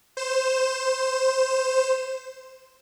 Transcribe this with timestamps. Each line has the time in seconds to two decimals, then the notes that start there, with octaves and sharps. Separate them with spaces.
0.17 C5 E7